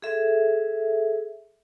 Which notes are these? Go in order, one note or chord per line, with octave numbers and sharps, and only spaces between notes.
G#4 A4 E5